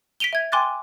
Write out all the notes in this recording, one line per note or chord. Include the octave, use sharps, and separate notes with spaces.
B6 D7 D#7 F7 G7
E5 G#6
G5 G#5 C6 D6 F#6 A6